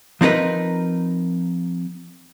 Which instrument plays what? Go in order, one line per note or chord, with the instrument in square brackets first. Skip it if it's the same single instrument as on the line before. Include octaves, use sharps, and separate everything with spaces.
[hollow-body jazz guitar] F3 C4 D#4 A#4 B4